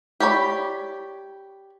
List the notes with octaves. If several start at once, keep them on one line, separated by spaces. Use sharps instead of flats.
G4 C#5 D5 B5